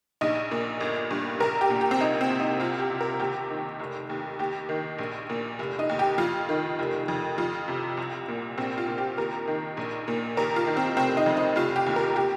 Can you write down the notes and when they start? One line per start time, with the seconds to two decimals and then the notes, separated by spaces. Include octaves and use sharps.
0.21 A#1 D#4
0.51 A#2
0.81 G1
1.11 G2
1.40 A#1 A#4
1.61 G4
1.70 A#2
1.81 G4
1.91 C4
2.00 C2 D#4
2.21 C4
2.30 C3
2.40 D#4
2.60 C2 F4
2.80 G4
2.90 C3
3.01 A#4
3.19 D#2 G4
3.50 D#3
3.80 F1
4.09 D#2
4.39 D#2 G4
4.69 D#3
4.99 A#1
5.29 A#2
5.59 F1
5.79 D#4
5.89 D#2
5.99 G4
6.18 F2 F4
6.49 D#3
6.79 F1
7.08 F2
7.38 F2 F4
7.68 C3
7.97 C2
8.28 A#2
8.58 A#1 C4
8.78 F4
8.88 A#2
8.98 G4
9.18 D#2 A#4
9.48 D#3
9.77 A#1
10.08 A#2
10.37 D#2 A#4
10.56 F4
10.67 D#3
10.77 C4
10.97 F1 C4
11.17 D#4
11.26 F2
11.37 D#4
11.56 F1 F4
11.76 G4
11.86 D#2
11.96 A#4
12.16 G4